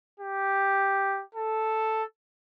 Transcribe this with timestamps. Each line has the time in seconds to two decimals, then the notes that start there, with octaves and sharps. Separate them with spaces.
0.20 G4
1.35 A4